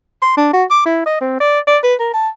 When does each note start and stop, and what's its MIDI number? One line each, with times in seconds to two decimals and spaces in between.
0.22 0.35 84
0.37 0.53 62
0.53 0.65 66
0.70 0.81 86
0.85 1.02 64
1.06 1.16 75
1.21 1.37 60
1.40 1.60 74
1.67 1.79 74
1.83 1.95 71
2.00 2.10 70
2.14 2.29 81